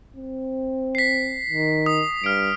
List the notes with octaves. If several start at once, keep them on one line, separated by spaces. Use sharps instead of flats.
C4
B6 C7
D#3
D#6
G2 F6 D7